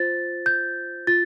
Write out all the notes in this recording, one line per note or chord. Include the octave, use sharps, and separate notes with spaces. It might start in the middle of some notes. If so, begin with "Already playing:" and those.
Already playing: F4 C5 A6
G6
F4 A6